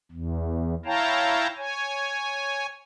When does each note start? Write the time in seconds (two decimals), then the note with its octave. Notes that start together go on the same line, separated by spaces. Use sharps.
0.11 E2
0.85 E4 C#5 F5 G5 A5 A#5
1.57 C#5 G#5